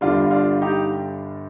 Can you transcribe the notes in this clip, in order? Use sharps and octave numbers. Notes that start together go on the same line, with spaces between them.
G1 G2 D3 G3 D4 F4
D4 F4
D#4 G4